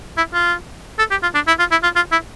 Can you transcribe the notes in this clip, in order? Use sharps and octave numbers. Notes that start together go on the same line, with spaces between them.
E4
F4
A4
G4
F4
D4
E4
F4
E4
F4
F4
E4